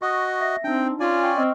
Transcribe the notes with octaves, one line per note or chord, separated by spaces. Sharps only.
F#4 D#5 C#6 D#6
E5 A#6
C4 D4 D#4 G5
C#4 F4 D5 G#5
G5 C6 C#6
C4 D#5 F6